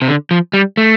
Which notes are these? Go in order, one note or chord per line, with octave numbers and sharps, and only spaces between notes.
C3
D3
F3
G3
A3